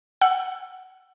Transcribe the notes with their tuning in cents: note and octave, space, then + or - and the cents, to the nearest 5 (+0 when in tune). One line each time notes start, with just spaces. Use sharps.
F#5 +10 E6 +25